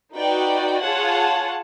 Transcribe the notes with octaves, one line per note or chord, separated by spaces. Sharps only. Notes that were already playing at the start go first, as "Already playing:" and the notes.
D#4 F#4 B4 D5 G5
F4 G#4 C#5 F#5 A5